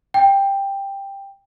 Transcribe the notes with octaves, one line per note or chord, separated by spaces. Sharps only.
G5